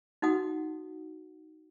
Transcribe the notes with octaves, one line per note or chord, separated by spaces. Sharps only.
D#4 F#4 F#5 D#6